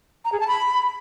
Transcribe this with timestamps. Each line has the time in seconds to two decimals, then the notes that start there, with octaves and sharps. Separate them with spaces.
0.25 A#5
0.32 G#4
0.40 A5
0.48 B5